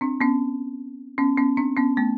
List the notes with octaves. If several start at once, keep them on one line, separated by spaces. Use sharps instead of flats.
C4 D4
B3 C#4
B3 C#4
B3 C#4
C4 D4
B3 C#4
A3 B3